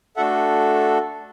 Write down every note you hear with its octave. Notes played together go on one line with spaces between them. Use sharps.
A3 D4 F#4 A4 E5 F#5